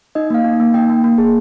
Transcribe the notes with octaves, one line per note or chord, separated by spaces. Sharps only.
D#4 D#5
A#3 F5
D#4
A#3
D#4 G5
A#3
A#3
G#4